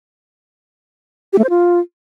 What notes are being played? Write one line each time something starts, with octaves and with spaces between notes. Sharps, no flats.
G4
A3
C5
F4